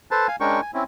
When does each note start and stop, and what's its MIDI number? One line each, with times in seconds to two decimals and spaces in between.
0.11 0.27 69
0.11 0.27 71
0.11 0.27 72
0.11 0.27 81
0.28 0.36 77
0.28 0.36 80
0.40 0.61 56
0.40 0.61 61
0.40 0.61 62
0.40 0.61 70
0.40 0.61 79
0.40 0.61 85
0.62 0.71 80
0.74 0.84 60
0.74 0.84 61
0.74 0.84 64